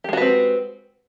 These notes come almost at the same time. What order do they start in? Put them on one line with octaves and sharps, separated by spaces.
G4 G#3 F#4 B4 C4